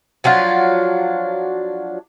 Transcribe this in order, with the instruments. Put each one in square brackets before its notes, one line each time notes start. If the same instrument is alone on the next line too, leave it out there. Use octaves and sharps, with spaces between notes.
[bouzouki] F3 F#3 D4 F4